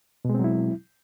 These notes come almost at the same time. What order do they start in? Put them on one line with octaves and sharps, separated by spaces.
B2 G#3 C4 F#3 E4